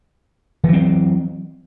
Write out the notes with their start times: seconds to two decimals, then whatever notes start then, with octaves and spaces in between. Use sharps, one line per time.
0.64 E3
0.68 F#3
0.73 C4